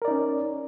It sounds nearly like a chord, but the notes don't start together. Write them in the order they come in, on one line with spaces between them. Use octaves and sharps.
A#4 D5 D#4 C#4